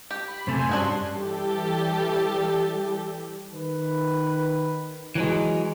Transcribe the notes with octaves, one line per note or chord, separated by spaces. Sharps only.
G4
B5
F#2 C3 A3 C5 G#5
G2 C#4 D4 F#4 G#4 C6
E3 G3 G4 A4
D#3 B4
E3 F#3 G#3